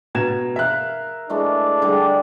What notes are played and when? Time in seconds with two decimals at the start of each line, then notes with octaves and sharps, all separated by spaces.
0.15 B2 A#5 G#6 E7
0.56 A#4 E5 F5 F#6
1.30 E3 G#3 A3 D4
1.82 D3 G3 G#3